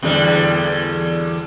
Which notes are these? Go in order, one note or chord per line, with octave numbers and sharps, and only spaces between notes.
E2 D3 G3